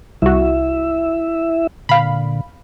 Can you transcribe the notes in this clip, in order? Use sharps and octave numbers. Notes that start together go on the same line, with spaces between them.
C2 E4 F#4 E5
A#2 D3 F5 B5